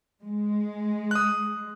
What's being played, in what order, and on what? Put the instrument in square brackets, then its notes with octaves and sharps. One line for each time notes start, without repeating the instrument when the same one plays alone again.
[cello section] G#3
[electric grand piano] D#6 F#6